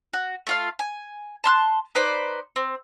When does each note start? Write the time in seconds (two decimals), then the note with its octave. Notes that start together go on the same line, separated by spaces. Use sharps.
0.13 F#4
0.47 A3 F4 F5
0.79 G#5
1.44 A5 C6 F6 F#6
1.95 D#4 B4 C5 D5
2.56 C4